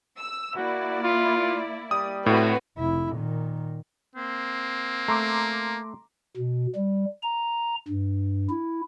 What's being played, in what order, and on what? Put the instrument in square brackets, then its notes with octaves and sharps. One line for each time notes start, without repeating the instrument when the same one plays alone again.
[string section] E6
[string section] A#3 E4 D5 [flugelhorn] F#4
[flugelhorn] F4
[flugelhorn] G3 [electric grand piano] D#6
[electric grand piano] A2 [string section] C4 F#4 B4
[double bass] F1 E4
A#2 D#3
[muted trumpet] A#3 [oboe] C4
[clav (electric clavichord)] A3 [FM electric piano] A#5 C6 D6
[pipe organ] B2
G3
A#5
G2
E4